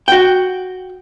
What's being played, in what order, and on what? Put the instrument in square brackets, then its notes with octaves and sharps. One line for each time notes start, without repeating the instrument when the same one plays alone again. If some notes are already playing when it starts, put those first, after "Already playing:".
[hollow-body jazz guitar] F#4 G5